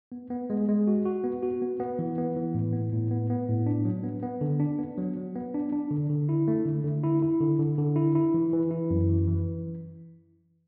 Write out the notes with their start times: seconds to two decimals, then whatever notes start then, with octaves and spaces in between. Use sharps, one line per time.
0.12 B3
0.30 B3
0.50 G#3
0.68 G#3
0.87 F#4
1.06 F#4
1.24 B3
1.43 F#4
1.62 B3
1.80 B3
1.99 E3
2.18 B3
2.36 E3
2.54 A2
2.73 B3
2.92 A2
3.11 B3
3.30 B3
3.49 A2
3.67 D4
3.85 F#3
4.04 B3
4.23 B3
4.41 D3
4.60 D4
4.79 B3
4.98 F#3
5.17 F#3
5.36 B3
5.54 D4
5.72 D4
5.90 D3
6.10 D3
6.29 E4
6.48 A3
6.65 D3
6.84 D3
7.03 E4
7.22 E4
7.40 D3
7.59 D3
7.78 D3
7.96 E4
8.15 E4
8.34 E3
8.53 E3
8.71 E4
8.90 F#2
9.09 E3
9.27 E3